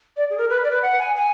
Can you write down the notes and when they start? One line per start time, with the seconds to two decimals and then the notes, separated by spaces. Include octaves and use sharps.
0.17 D5
0.30 G#4
0.38 A#4
0.50 B4
0.64 D5
0.71 B4
0.82 F#5
0.99 G#5
1.16 G#5